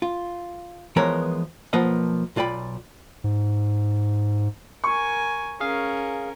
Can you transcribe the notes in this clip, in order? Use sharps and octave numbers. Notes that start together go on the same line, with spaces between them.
F4
E3 F3 G#3 B3 A#4 C#5
B1 F3 A#3 B4 D#5 F#5
B1 F4 D5 G5 B5
G#2
A#4 G#5 C#6
C#4 G#4 A#4 F5